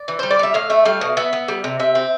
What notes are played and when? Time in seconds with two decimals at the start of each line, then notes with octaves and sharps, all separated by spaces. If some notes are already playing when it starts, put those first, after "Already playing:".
Already playing: D5
0.08 E3
0.19 G3 C5
0.31 D5
0.39 G3 E5
0.54 A2 F5
0.70 A3 E5
0.85 G3 F5
1.01 B2
1.17 B3 E5
1.33 B3
1.48 G3
1.64 C3
1.79 C3 E5
1.95 C4